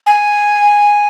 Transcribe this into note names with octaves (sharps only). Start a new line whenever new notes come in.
G#5